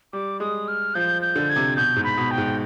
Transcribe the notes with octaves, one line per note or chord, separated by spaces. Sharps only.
G3 D6
G#3 D#6
F6
F3 G6
G6
D3
G#6
C3
B2 G6
G#2
B5
B2
G5
G#2